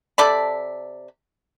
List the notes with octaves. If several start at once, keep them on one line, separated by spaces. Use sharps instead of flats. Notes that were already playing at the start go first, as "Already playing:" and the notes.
C3 A4 D5 B5